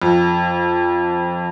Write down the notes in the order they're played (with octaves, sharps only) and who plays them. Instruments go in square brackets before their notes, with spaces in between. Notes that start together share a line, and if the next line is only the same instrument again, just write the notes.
[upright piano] F2